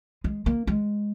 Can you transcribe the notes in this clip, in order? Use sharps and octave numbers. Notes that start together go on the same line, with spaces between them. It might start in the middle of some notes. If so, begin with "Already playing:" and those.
G#3
A#3
G#3